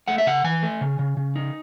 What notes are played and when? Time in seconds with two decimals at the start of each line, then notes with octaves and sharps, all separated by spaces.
0.08 A3 F#5
0.18 E5
0.26 C#3 F#5
0.44 E3 G#5
0.63 A3
0.81 C#3
0.99 C#3
1.17 C#3
1.36 D#4